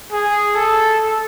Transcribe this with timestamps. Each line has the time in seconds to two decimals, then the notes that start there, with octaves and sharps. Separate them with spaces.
0.12 G#4
0.55 A4